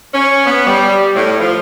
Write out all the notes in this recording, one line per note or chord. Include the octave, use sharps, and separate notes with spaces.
C#4
B3
G3
A2
F3